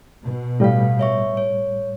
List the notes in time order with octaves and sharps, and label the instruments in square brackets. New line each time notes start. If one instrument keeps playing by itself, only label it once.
[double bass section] B2
[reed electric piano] A2 G3 [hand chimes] A4 F5
[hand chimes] C#5 E5 C#6
C#5